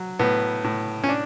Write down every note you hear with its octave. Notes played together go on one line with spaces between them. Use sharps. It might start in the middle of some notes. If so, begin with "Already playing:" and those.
Already playing: F#3
A2 B3
A2
C#4
D4